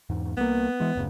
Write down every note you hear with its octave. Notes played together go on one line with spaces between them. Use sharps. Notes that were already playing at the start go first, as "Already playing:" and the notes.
E2 G#2
C2 A#3 B3
E3 G#3
D1 F#2 C#3